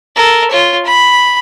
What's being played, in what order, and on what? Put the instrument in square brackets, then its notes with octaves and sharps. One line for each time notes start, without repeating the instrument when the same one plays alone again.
[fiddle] A4 A#4
F4 C#5
B5